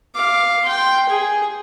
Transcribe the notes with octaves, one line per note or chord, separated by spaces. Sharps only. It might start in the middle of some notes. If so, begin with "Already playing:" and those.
F5 D6
G5 C6
G#4